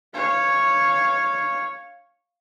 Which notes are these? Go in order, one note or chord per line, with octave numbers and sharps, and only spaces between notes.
C#5 F5